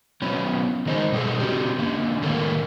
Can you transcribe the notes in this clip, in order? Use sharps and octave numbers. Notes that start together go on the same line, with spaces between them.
F#3 B3 C#4 E4
D#3 G#3 D#4 C5
B2 G3 A3 G#4 A4
C#4 F#4 G4
D3 A#3
A2 D#3 A#3 A4